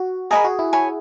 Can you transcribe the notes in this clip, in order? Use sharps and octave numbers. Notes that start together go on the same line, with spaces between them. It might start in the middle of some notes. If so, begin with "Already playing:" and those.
Already playing: F#4
G#4 A#4 D#5 G#5 B5
F#4
E4
C#5 G#5 B5